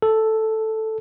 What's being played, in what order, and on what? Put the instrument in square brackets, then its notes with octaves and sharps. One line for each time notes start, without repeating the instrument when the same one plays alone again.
[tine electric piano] A4